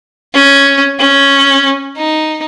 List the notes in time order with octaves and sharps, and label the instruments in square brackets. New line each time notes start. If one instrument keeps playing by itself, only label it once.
[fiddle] C#4
C#4
D#4